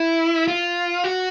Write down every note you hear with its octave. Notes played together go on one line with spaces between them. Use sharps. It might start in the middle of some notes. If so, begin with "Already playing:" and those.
Already playing: E4
F4
F#4